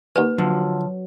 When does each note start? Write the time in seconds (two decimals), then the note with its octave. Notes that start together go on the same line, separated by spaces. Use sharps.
0.16 D#2 B4 F#5 G#5
0.38 D3 F3 F#3